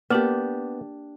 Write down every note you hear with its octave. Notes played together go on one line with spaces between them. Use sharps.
A#3 B3 D4 G4 A#4